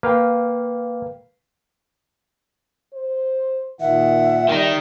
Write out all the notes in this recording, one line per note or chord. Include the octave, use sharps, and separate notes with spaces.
A#3 B4 F5 G5
C5
A#2 D#3 E5 F#5
D#3 G3 D#4